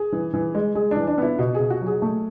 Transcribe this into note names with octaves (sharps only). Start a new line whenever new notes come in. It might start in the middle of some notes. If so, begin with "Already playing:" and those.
Already playing: G#4
E3
E3
G#3
G#3 G#4
D4
E3
D4
B3 E4
B2 F#4
G#4
B2
F#4
F#3
G#4
A3